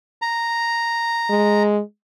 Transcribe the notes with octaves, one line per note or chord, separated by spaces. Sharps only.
A#5
G#3